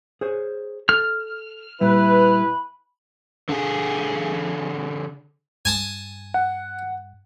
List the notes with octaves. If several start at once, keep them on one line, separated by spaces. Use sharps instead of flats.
G#4 C5 C#5
A4 F6
A#2 G3 E4 B4 B5
D3 G#4
G2 G#5 A5 D#6
F#5